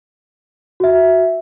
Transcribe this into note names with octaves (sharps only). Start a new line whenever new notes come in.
F#4 E5